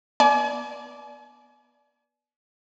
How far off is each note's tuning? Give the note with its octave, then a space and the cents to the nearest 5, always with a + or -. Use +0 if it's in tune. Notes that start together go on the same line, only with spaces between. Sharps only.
B3 -15 D5 +0 G#5 +45